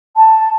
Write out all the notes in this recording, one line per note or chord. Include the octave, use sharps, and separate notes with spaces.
A5